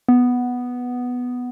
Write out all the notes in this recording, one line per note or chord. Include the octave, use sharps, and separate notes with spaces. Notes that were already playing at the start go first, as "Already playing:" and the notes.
B3